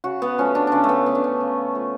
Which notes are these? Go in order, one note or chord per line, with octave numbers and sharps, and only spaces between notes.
C#3 F#4
B3
F3 A3 C#4
D4
C#3 C#4 D4
A3
B3
F3 A3 B3
D4
C#4
C#3
F3 A3